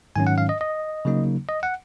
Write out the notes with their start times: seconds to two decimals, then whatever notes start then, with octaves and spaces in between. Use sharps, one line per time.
0.16 G#2 D#3 F#3 C#4 G#5
0.27 F#5
0.38 F5
0.49 D#5
0.61 D#5
1.05 C#3 F#3 A#3 D#4
1.49 D#5
1.63 F#5